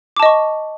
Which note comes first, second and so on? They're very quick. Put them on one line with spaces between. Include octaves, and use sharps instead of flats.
D6 A5 D#5 C#6